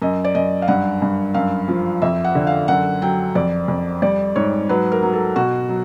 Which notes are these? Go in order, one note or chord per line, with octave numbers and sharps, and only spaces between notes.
F#2 D#5
D5
F#2 D#5
F5
G2 F#5
G2
F#2 F5
F3
F2 E5
F#5
D3
F5
F#2 F#5
F#3 G5
F2 D5
F2
G3 D5
G#2 C#5
F#3 B4
A#4
F#3
A4
B2 F#4
F#3